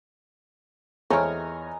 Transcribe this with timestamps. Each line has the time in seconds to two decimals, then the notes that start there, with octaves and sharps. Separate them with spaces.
1.10 E2 A3 C4 C#5 D#5 G#5 A#5 F6